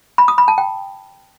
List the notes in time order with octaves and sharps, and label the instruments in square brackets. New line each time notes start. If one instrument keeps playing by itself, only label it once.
[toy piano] B5
D#6
B5
A5
G5